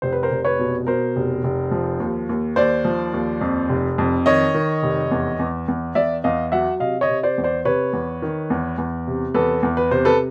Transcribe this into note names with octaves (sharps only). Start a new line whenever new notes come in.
F1 C5
B4
A#4 C5
F1
B4 C#5
B2
B2 A#4 C5
F1
F1
F3
D#2
D#2
D#2 C5 D5
F3
D#2
F2
F1
F2
D#3 C#5 D#5
D#3
F1
E2
E2
E2
E2 D5 E5
E2 D#5 F5
F#3 E5 F#5
C3 D#5 F5
C#5 D#5
C3
C5 D5
E2
C5 D5
C3 B4 C#5
E2
D#3
E2
E2
C3
E2 A4 B4
E2
B4
C3 C5
A4 B4